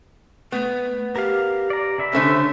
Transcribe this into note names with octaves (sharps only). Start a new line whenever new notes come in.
A3 B3
G4 A#4 F5
D5 A#5
C#3 E5 B5
D3 A3 C#4 C5